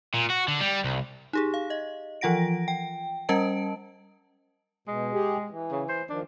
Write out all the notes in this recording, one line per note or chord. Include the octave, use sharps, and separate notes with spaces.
A#2
F#4
D3
G3
C2
D#4 G4 G#4
F5
D#5
E3 F3 F4 F#5 A#6 D7
G5
G3 C#4 A#4 D#5 A5 D7
B2 G#3
G4 G#4
E3
C#3
C5
D#3 F3 D4